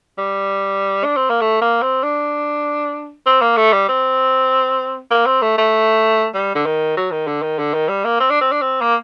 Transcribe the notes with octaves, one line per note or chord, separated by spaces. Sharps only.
G3
D4
C4
A#3
A3
A#3
C4
D4
C4
A#3
A3
G3
C4
A#3
C4
A3
A3
G3
D3
D#3
F#3
D#3
D3
D#3
D3
D#3
G3
A#3
C4
D4
C4
D4
C4
A#3